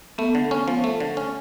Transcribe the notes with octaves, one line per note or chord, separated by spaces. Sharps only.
A3 B3
D3
C#4
F3
A3
D3
C#4